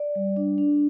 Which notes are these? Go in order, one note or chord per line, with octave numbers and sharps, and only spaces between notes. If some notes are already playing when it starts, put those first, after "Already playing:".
Already playing: D5
G3
D4
D4